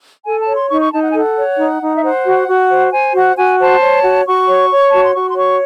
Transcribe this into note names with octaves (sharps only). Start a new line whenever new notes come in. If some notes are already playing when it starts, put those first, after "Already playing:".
A4 G#5
A5
C#5
C6
D#4 C#6
C#6
D#4 A5
F#5
G#5
A4 F#5
C#5
D#4
D#4
E5
C5 F#5
F#4
F#4
C5
C5 G#5
F#4 F#5
F#4 G#5
C5 A5
C#5
F#4
F#4 C#6
C#5
C#5
F#4 A5
C6
F#4 C#6
C6
C#5 C#6